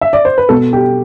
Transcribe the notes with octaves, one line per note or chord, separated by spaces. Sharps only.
E5
D5
C5
B4
B2 A4
G4